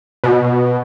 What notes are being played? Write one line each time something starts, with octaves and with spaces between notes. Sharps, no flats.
B2